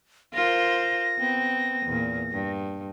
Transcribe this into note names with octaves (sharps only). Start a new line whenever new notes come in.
F4 A#4 C5 A#6
B3 C4
E2 A#2
G2